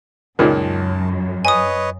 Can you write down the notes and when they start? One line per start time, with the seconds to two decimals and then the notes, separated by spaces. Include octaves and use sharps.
0.39 C#2 F#2 A#2 D#3 A5
1.45 B4 C#5 D#5 G#5 D#6